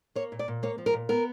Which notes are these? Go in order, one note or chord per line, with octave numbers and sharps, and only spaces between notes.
A#3 C#5
A#2
D5
A#2
A#3 C#5
F3
A#4
A#2
B3 A#4